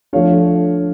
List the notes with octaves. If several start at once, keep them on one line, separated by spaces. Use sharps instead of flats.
F3 A3 D4 C#5 F5